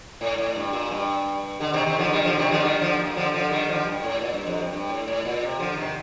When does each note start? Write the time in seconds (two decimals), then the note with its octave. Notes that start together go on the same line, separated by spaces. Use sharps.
0.21 A2
0.38 A2
0.56 G2
0.73 A#2
0.91 G2
1.60 D3
1.73 C3 D#3
1.86 C3 D#3
1.99 D3 F3
2.12 D#3 G3
2.25 D3 F3
2.38 C3 D#3
2.51 D3 F3
2.64 D#3 G3
2.81 D3 F3
2.99 A#2
3.16 D3 F3
3.34 D3 F3
3.51 D#3 G3
3.69 D3 F3
3.85 G2
4.04 A2
4.21 A#2
4.33 G2
4.47 F2
4.60 G2
4.73 G2
4.89 A2
5.08 A2
5.25 A#2
5.42 C3
5.59 D3 F3
5.76 C3 D#3